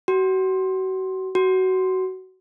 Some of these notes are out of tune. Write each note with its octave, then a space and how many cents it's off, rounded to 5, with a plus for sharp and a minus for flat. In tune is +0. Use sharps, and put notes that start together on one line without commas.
F#4 +35
F#4 +20